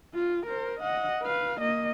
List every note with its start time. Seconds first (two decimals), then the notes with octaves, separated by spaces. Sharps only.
0.14 F4
0.46 A#4 C5
0.80 D#5 F#5
1.23 B4 F5
1.61 A#3 D#5